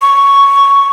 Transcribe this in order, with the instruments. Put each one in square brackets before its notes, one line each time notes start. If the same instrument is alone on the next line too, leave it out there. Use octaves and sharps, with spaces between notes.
[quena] C#6